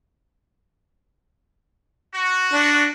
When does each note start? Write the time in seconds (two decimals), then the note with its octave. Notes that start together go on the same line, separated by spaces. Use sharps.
2.14 F#4
2.53 D4